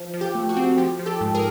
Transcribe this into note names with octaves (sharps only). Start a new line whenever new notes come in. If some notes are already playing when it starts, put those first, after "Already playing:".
Already playing: F3
F3
G4
A3
F#4
C4
F3 G4
F3
G4 A4
G#2
G#4 A#4